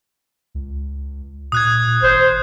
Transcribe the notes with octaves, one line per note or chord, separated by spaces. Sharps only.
C#2
A#2 D#6 F#6 G#6
G#1 C5